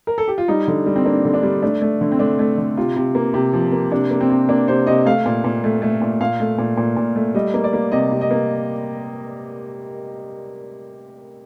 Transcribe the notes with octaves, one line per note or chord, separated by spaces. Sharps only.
A#4
A4
G4
F4
G3 D#4
D3
G3
C4
A#3 D4
D3
D4
G3
A3 D4
A3
D3
C4
A3 D4
A3
D3
C3 F4
C3
A#3
C3
F3
A#3
C3 D4
A#3
C4
C3
A#3 D4
C3 C5
C3 D#5
A3 F5
A#2
A#2
A3
A3
A#2
A#2 F5
A3
A#2
A#2
A#2
A3
G3 D#5
A#3
D5
A#3
C3 D#5
C3
D#5
A#3